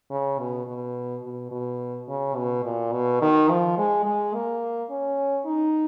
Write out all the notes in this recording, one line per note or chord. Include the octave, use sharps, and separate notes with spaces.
C#3
B2
B2
B2
B2
C#3
B2
A#2
B2
D#3
F3
G#3
G#3
A#3
C#4
D#4